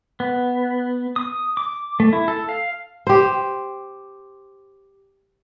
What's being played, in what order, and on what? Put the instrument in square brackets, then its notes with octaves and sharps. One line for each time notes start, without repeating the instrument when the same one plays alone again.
[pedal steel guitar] B3
D#6
D6
A3
E4
A4
F5
[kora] G4 C5